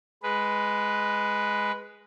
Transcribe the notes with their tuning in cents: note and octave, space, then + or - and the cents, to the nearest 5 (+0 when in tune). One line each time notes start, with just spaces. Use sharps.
G#3 +0 B4 +0